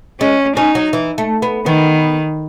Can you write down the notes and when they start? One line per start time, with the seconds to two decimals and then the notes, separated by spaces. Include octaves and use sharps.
0.20 G#3 C#4
0.56 C#4 D#4
0.75 F#3
0.93 E3
1.18 A3
1.42 B3
1.66 D#3 B3